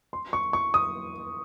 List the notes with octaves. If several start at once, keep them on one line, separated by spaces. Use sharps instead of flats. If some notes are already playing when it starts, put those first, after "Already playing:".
C6
C#6
C#6
D#6